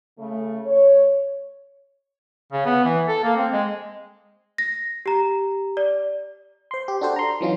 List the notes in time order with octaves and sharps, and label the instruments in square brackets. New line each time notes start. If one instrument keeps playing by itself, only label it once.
[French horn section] C#3 A3
C#5
[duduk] C#3
B3
E3
A4
A#3
C4
G#3
[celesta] A#6
G4 A#5
D5
[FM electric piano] C5 C6
G4
D4 F#4 A4 C5
A#5 C6
E3 F#3 C#4 D#4 F4